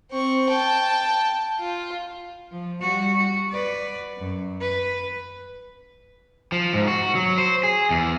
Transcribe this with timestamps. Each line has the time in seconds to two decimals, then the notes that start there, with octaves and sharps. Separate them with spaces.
0.11 C4 C#6
0.49 G5 A5
1.59 F4
2.52 F3
2.81 G3 F#4
3.16 F#4
3.49 B4 D5
4.18 F#2
4.61 B4
6.52 F3
6.73 G#2
6.88 F#4
7.15 F#3
7.38 C5
7.63 G#4
7.90 E2